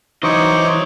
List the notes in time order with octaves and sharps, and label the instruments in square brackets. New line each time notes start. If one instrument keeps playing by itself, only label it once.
[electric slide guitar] E3 F#3 [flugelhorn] D#4 [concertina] C5 C#6 D6 [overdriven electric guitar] C#5 D#5